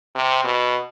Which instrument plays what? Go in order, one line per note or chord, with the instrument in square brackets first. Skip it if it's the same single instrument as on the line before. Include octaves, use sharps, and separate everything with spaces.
[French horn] C3
B2